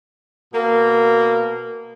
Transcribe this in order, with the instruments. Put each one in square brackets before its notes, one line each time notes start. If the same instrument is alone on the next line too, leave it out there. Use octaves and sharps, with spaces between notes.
[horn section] B2 A#3